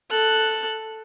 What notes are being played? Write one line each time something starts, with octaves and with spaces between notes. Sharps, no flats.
A4 F#6